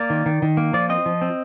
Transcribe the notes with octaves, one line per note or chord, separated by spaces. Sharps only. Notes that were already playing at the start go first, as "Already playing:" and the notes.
Already playing: A#3 D5
D#3
D#3
D#3
A#3
F3 D5
C4 D#5
F3
C4